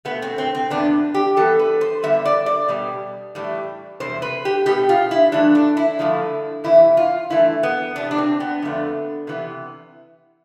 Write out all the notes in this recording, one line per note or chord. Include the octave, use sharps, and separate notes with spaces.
B2 A3 B3
C4
C4
C4
E2 B2 B3 D4
G4
G2 E3 B3 A4
B4
C5
E2 D3 G3 B3 E5
D5
D5
B2 G3 B3
A2 E3 G3
E2 C3 G3 C5
B4
G4
B2 B3 G4
F4
E4
G2 E3 A3 D4
D4
E4
G2 D3 F3 A3
E2 C3 E3 E4
F4
G2 E3 A3 E4
B3
E2 C3 E3 B3 D4
D4
C4
B3
F2 D3 A3
C3 E3 B3